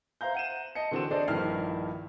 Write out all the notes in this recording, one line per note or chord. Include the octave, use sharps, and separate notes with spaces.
C5 E5 F5 A#5 G6
F#5 D#7 E7
D#5 A5 C#7
D3 E3 C4 F#4 A4 E7
D4 G#4 A4 C5 D5 D#5
A#1 G2 D#3 E4 F6 C7